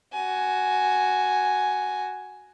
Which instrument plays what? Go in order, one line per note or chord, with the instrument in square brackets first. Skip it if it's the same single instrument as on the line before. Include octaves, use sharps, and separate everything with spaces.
[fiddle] F#4 G#5